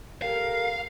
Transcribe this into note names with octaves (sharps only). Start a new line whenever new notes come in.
G4 A4 A#4 F5